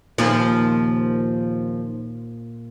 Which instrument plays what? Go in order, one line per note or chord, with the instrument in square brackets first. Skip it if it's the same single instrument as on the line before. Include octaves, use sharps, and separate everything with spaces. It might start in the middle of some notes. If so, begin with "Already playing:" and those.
[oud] D#2 F3 [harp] A#2